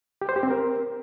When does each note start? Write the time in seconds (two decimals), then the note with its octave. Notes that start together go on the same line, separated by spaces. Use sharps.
0.22 G4
0.29 C5
0.36 G4
0.43 C4
0.50 A#4